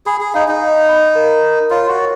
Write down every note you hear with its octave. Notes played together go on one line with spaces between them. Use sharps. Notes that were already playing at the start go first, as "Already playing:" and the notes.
G#4 B5
G#4
D#4 F5
D#4
F5
B5
A#4
A#4
F4 C#5
F#4
C#5